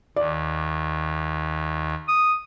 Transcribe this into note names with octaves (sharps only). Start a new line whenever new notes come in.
D#2 D5
D#6